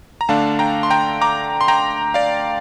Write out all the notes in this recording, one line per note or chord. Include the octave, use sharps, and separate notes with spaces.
A#5
D3 A3 D4 F5 A5
G5 A#5
C6
G5 A#5
A#5 D6
C6
G5 A#5
D5 F5